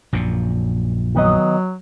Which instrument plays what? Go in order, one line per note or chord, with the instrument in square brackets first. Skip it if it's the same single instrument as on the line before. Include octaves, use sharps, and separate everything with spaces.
[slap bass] A#1 F#2 A#2
[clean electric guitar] D#3 B3 D#5 [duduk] F#3